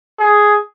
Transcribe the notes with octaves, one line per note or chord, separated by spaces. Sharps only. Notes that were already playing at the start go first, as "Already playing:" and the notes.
G#4